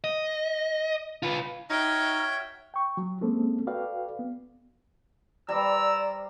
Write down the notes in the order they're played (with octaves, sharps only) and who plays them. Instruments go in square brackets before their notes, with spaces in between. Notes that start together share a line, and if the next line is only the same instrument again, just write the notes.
[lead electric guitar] D#5
F4 B4
[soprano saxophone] D#4 [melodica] F#4 C#5 [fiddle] E5 G5 [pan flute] F6
[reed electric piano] G5 C#6
F#3
G#3 A#3 C4 C#4 A4
F#4 A4 B4 D5 F5 G5
B3
[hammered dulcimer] G3 C5 [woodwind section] D5 A#5 [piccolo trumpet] E6